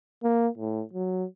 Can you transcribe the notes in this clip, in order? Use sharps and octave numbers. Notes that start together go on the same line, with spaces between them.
A#3
A2
F#3